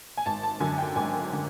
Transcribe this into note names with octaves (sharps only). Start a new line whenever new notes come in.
G#5
G#1 A5
A5
F#2 D3 G#5
G5
G#1 G#5
D3